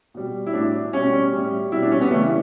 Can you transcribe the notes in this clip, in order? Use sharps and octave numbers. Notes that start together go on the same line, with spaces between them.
B2 G3
E4
A2 F#3 D4
B2 G3 C#4
A2 G3
B2 G3 E4
D4
C#4
B3
C#3 E3 G3 A3